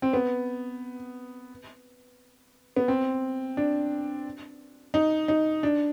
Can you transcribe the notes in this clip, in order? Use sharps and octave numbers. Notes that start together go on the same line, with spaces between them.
C4
B3
B3
C4
D4
D#4
D#4
D4